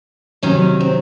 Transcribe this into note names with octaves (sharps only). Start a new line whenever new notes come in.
C3 D#3 F#3 C#4
C4